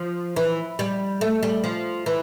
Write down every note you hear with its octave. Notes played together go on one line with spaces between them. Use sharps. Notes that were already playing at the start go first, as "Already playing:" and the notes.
Already playing: F3
E3
G3
A3
G3
F3
E3